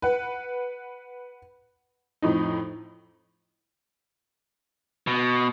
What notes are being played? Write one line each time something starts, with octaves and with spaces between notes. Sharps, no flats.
B4 F#5
F2 A2 D#4
B2